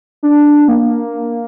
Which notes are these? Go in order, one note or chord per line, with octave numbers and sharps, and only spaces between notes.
D4
A#3